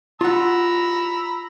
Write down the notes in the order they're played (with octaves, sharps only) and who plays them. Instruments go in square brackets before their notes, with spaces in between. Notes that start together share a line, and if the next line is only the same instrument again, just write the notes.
[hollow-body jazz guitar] F4 F#5 [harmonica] A#5 B5 E6